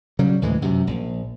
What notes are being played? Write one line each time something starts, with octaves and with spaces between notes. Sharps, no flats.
C#3 F#3 G3
D2 A2 E3 G#3
F#2 C3
A#1